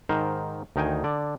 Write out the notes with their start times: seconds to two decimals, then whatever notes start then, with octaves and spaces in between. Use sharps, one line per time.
0.09 G#2 D#3 A#4 C5
0.76 D2 D#3 D#4 G5 G#5
1.04 D3 D5